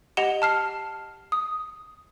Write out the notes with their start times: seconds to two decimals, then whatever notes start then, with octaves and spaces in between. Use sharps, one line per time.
0.17 G4 D#5 F#5 E7 F7 G7
0.42 A5 F6 C7
1.32 D#6